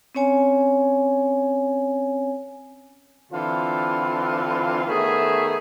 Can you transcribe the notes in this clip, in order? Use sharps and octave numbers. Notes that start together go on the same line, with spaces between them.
C4 C#4 C#5 G#5
D3 E3 C4 F4
D#3 A3 B3 G#4 C#5 E5